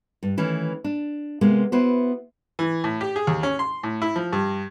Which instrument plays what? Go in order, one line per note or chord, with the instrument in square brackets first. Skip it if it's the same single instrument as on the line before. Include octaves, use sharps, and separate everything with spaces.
[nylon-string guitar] G2
D#3 E3 A3 C#4
D4
C3 G#3 A#3 B3
B3 E4 F#4 C5
[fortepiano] E3
A2
G4
G#4
D#2
C#4
C6
A2
E4
F3
G2